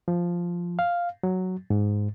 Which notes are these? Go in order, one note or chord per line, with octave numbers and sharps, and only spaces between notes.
F3
F5
F#3
G#2